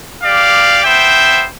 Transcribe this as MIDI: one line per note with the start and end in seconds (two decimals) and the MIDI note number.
0.23 0.82 67
0.23 0.82 74
0.23 0.82 77
0.85 1.46 59
0.85 1.46 72
0.85 1.46 76
0.85 1.46 79